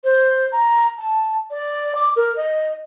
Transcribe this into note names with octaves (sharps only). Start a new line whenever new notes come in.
C5
A#5
A5
D5
D6
A#4
D#5